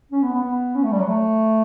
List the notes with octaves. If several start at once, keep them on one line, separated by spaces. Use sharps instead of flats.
C#4
B3
B3
B3
C#4
A3
G3
F#3
A3